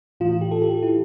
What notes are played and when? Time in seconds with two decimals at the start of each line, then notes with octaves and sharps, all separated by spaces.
0.20 A2 E3 F4
0.41 G4
0.51 A4
0.62 G4
0.83 E4